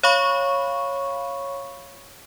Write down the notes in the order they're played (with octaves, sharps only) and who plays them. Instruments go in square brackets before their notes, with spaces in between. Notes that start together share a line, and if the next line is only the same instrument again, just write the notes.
[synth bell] C#5 F5 B5 C#6